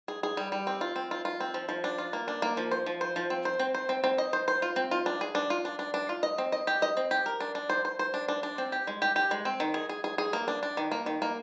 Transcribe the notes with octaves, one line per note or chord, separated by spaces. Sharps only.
G#4
G#4
G3
G3
C4
F4
C4
F4
F4
C4
F3
F3
D4
F4
A#3
D4
A#3
F3
C5
F3
C5
F3
C4
C5
C4
C5
C4
C4
D#5
C5
C5
F4
C4
F4
D4
G#4
D4
F4
D4
D4
D4
F4
D#5
C4
D#5
G4
D#5
C4
G4
A#4
D4
D4
C5
C5
C5
D4
D4
D4
C4
G4
G#3
G4
G4
G#3
C4
D#3
G#4
G#4
G#4
G#4
A#3
D4
D4
D#3
A#3
D#3
A#3